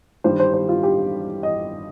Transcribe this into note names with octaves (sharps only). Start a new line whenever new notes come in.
G2 D#3 G3 C5
C5
C5
F4
G4
D#5